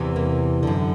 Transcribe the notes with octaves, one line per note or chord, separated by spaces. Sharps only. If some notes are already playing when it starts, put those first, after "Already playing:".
Already playing: E2 C3 E3
A#3
F#2 D3